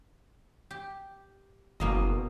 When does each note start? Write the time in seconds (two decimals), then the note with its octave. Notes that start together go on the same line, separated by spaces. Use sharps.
0.71 G4
1.80 F#1 B2 A#3 D#5